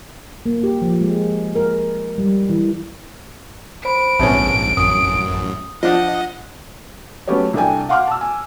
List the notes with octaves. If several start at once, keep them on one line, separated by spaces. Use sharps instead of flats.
A#3
G4
F3
G#3
A#4
G3
E3
C5 B5 D7
A#1 G#2 C3 B3 C#4 A5
A1 F#2 D#6
F3 D4 F4 D#5 F#5
F#3 A3 B3 C#4 G4 C#5
C2 D4 A4 G5 G#5
F5 F#5 C6 D6 F6
A5 E6
G#5